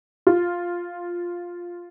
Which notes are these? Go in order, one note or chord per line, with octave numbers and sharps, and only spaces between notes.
F4